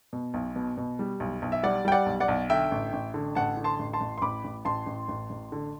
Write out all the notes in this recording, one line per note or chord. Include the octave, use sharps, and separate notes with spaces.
B2
B1
B2
B2
G3
B1
B1
E5
G3 D5 F#5
G3 G5
D5 F#5
B1
D5 F#5
B1
D3 E5 G5
A1
A1
D3
A1 F#5 A5
D3
A5 C6
A1
A5 C6
A1
C6
A1 B5 D6
A1
A1 A5 C6
A1
A1
A1
D3